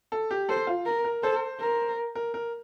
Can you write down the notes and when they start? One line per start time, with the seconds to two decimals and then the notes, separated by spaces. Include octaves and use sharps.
0.12 A4
0.31 G4
0.49 A4 C5
0.67 F4
0.86 A#4
1.05 A#4
1.23 A4 C5
1.60 A#4
2.15 A#4
2.34 A#4